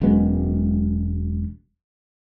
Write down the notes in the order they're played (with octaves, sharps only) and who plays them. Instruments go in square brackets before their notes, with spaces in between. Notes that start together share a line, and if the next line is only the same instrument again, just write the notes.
[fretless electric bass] E1 F#2 G#3 B3